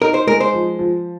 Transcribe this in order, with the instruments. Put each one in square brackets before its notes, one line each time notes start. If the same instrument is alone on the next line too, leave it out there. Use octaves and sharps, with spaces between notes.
[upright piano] D#4 [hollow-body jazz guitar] A#4
[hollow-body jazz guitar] C5
[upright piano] G#3 [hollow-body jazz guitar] A#4
[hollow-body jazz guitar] C5
[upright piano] F3
F3